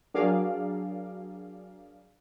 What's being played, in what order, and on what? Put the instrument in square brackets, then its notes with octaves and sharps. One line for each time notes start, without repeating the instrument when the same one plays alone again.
[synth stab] F#3 D4 G#4 A#4 D5 F5